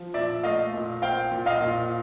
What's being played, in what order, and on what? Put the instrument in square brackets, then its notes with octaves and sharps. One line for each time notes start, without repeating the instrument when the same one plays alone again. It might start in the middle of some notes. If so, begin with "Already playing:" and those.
Already playing: [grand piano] F3
A#2 D5 E5
A3 D#5 F5
A#2
C4 F5 G5
A#2
D#5 F5
A#2